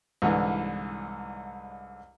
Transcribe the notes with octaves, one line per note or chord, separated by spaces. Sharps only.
C2 G#2 D3 E3